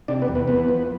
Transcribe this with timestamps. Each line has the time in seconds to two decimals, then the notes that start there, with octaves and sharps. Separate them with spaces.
0.08 C3 D4 D5
0.22 B3 B4
0.28 E2
0.35 B3 B4
0.48 E2 B3 B4
0.68 F3